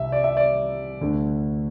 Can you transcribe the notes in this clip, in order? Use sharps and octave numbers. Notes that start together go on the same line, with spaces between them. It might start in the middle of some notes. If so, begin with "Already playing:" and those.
Already playing: C2 C3 E5
D5
E5
D5
D2 D3 A3